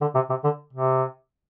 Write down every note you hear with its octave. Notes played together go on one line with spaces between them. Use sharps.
D3
C3
C3
D3
C3